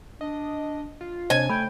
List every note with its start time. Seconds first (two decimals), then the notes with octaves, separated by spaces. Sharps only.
0.21 D4 D#5
1.01 F4
1.30 C3 D4 C5 C#5 D#5 G#5
1.50 A3 G5 B5